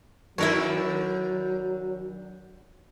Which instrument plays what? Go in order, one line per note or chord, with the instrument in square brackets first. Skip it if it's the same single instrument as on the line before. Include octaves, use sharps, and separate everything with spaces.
[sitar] D#3 D4 A4 [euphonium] F#3 [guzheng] E4 A#4 C#5